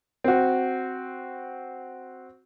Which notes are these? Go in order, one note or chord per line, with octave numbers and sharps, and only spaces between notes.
C4 F#4